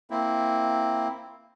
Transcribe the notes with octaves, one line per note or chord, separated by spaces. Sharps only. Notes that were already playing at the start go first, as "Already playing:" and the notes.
A#3 C4 E4